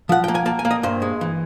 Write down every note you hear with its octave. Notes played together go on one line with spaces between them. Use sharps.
F3 F#5
A#3 G5
G#5
A#3 A5
G#5
A#3
D#5
G2 C5
G#3
E3